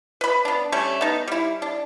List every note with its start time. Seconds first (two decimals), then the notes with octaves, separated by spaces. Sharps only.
0.21 B4 B5
0.45 B3 D4
0.72 G3 A3 C#4
1.01 B3 D#4
1.28 G3 E4
1.62 D4